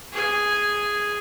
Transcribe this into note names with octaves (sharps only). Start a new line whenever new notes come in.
G#4 G#5